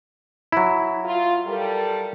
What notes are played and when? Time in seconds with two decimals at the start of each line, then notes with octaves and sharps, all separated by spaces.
0.52 F#3 E4
1.05 F4
1.47 G3 A4 A#4